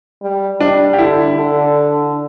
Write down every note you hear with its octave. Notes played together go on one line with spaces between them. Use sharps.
G3
G3 D4
G4
D3 E4
D3